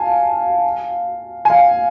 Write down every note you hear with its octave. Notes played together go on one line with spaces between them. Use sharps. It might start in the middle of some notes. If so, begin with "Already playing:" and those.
Already playing: F5 G#5 A5
G#5
F5